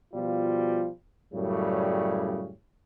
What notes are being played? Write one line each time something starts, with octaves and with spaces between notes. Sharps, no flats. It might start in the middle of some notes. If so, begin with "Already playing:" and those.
B2 F3 G3 F4
F#2 A2 C#3 G3